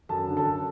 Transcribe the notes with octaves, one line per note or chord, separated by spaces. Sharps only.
F#2 A4 A5
D3
A4 A5
F#2